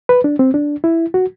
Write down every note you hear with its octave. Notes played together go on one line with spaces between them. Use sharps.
B4
D4
C4
D4
E4
F#4